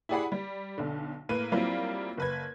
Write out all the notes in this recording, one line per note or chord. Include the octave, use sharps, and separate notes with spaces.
E4 G4 G#4 D5 F#5 B5
G3
B1 D3
A2 A#3 B4 D#7
F#3 G3 A#3 C4 E4 F4
F#1 B4 G#6